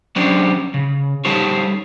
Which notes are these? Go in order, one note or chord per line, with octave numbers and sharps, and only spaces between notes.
F#3 C#4 D4 G4 C5 D5
C#3
G3 D#4 G4 A4 C5 C#5